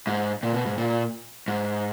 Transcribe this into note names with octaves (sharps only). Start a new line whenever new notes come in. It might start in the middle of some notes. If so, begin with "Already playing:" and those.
G#2
A#2
B2
G#2
A#2
G#2